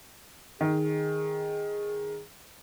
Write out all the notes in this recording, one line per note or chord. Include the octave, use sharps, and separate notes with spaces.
D#3 G#4